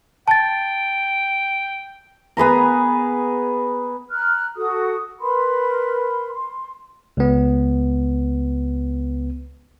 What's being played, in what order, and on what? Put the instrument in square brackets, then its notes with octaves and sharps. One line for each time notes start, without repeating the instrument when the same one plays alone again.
[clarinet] G5 [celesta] A5 A6
[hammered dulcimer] B3 G#4 B4 A#5
[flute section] A#5 F6 F#6
F#4 A4 D#6
A#4 B4 B5 C6
C6
[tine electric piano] C#2 B3